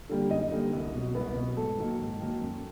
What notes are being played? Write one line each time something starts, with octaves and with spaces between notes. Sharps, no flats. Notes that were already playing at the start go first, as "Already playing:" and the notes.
D3 G3 A#3
F#2 D#4 D#5
D3 G3 A#3
C2
B2 F#3
C2 B3 B4
B2 F#3
G#2 A3 A4
D#3 F#3 A#3
G#2
D#3 F#3 A#3
F#2